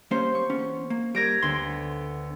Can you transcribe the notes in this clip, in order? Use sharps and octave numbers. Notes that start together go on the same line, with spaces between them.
G3 A#3 C#4 C5
C#6
E2 B3 C#4
A#3
G3 A#4 G#6 A#6 D7
D2 D3 B3 C6